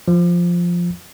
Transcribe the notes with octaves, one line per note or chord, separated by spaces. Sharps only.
F3